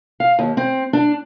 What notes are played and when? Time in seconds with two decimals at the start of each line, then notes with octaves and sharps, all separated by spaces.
0.20 F5
0.39 D#2
0.57 C4
0.93 D4